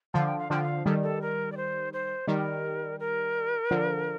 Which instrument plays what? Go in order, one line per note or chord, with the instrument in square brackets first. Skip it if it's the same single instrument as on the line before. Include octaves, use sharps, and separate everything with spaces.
[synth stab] D3 F3 [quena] F5
[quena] G5
F5
[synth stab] D3 F3 [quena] G5
[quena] F5
[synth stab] D#3 G3 [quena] A4
[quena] A4
A#4
D5
C5
C5
[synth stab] D#3 G3 [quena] A#4
[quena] A#4
[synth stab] D3 F3